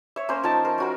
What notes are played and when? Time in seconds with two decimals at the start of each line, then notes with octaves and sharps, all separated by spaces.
0.16 C#5 E5
0.29 A#3 C#4 C5
0.43 F3 D#4 A#4 A5
0.65 A#4 C5
0.78 C#4 F#4 A#4